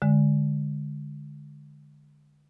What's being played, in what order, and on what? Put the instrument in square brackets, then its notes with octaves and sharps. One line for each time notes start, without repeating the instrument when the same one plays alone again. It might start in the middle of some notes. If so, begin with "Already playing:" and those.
[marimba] D3 G#3